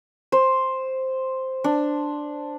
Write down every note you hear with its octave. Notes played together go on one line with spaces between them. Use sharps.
C5
D4